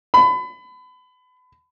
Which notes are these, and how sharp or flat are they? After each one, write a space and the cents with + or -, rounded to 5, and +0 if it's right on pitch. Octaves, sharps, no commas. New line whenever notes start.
B5 +30